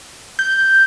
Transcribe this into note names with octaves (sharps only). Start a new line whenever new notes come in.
G6